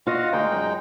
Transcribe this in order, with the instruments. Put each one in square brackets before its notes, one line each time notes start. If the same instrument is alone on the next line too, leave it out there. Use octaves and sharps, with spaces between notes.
[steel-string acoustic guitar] F4 D#5 [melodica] F#4 F5 F#5
[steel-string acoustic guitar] D2 [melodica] G#3 D#4 G5
[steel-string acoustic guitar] F#2